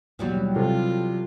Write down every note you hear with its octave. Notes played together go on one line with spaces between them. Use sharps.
D#2 B2 E3 F#3 G3
C3 F4 A4